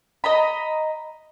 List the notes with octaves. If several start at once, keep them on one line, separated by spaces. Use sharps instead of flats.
D#5 A#5 B5